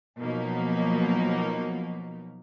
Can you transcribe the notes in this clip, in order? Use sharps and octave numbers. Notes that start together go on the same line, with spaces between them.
B2 F3 F#3 A#3 D#4